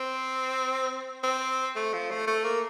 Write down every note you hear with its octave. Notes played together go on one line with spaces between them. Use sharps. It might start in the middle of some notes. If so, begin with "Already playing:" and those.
Already playing: C4
C4
A3
F3
A3
A3
A#3